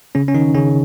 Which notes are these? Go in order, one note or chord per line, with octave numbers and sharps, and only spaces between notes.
C#3 C#4
C#4
D#3 D#4
C#3 C#4